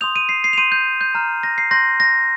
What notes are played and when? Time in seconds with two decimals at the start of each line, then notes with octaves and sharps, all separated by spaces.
0.01 C6 D#6 G6 F7
0.16 D#7
0.29 C7
0.44 C7
0.53 F7
0.57 C6 G6 D#7
0.72 G6
1.01 G6
1.15 A#5 F6
1.43 A#6
1.58 C7
1.71 C6 G6 A#6
2.00 A#6